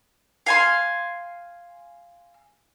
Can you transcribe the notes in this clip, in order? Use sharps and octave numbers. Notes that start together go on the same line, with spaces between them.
F5 G#5 C6